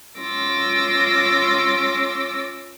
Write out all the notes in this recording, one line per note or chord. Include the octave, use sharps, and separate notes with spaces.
C#4 F4 C6 D6 E6 A#6